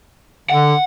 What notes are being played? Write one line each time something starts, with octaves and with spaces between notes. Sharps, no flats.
D3 F#5